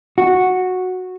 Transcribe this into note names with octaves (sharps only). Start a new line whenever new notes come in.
F#4